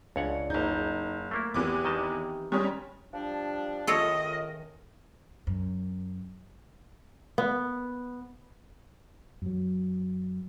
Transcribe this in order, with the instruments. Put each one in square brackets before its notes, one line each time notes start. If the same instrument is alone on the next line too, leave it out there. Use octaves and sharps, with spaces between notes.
[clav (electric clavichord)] C#2 C#5 F#5 [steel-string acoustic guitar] D4
[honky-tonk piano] F#1 G6 [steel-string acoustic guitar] D#4
[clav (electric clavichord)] A3 A#3 E4
[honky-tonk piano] E2 B3 D6 [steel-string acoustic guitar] E3 C4 G4
[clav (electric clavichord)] D#3 D#5 A5
[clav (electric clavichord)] D#3 G#3 [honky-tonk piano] G3 C#4
[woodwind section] F3 G3 D4
[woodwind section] C#2 A2 D#3 [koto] F4 A4 C#5 [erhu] D#5
[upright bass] F#2
[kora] B3
[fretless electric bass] F#2 F#3